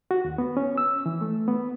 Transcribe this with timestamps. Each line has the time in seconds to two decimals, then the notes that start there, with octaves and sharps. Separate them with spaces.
0.11 F#4
0.24 D#2
0.38 B3
0.57 C#4
0.78 E6
1.06 E3
1.21 A3
1.48 B3